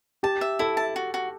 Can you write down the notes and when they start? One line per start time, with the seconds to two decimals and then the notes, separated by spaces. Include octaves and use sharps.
0.23 G4 A5
0.41 E5
0.59 E4 A4
0.77 A5
0.96 F#4
1.14 F#4